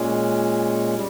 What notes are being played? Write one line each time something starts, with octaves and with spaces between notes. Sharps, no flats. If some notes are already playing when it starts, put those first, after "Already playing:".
Already playing: A#2 G#3 C#4
G3